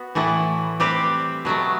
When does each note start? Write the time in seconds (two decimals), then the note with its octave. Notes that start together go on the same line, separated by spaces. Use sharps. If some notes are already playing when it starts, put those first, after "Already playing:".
Already playing: B3 F#4
0.15 A2 E3 A3 E4
0.80 G3 C4 G4 B4
1.45 B2 F#3 A3